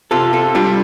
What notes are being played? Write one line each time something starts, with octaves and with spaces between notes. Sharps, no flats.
C3 F4 A4
F4 A4
G3 D4 F4